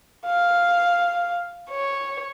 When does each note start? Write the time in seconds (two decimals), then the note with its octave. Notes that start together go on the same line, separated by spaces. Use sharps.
0.26 F5
1.70 C#5